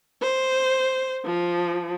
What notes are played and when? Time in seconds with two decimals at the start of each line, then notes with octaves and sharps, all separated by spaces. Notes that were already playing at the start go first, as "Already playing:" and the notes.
0.22 C5
1.25 F3